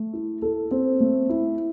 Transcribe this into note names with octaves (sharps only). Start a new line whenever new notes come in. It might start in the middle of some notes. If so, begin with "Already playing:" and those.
Already playing: A3
E4
A4
C4
A3
E4